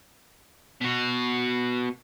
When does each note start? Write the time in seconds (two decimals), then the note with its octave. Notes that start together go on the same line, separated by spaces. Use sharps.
0.81 B2 F#4